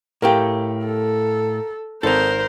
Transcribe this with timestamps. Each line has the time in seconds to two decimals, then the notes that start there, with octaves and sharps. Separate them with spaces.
0.22 A2 A3 G4 A#4 F5 G5
0.86 A4
2.03 G#1 D#4 A4 A#4 C5